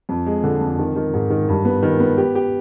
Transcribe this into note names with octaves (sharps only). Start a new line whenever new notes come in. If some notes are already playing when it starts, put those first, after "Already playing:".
F2
G#3
D3
F2
D#3
D#3
G#2
D#3
G2
B3
D#3
B3
G4
G4